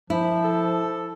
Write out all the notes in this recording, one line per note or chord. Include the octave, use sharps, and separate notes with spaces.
F3 E4
A4